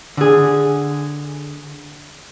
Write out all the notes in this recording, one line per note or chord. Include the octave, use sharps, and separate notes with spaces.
D3 G#4